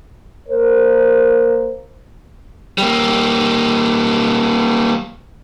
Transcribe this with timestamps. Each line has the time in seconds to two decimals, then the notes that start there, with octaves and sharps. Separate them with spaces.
0.49 A#3 A#4 C5
2.78 G3 A#3